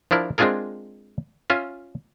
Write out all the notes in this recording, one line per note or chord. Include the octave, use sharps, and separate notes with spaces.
F3 D4 E4 A#4
G#3 C4 D4 F4 G#4 A#4
C#4 F4 E5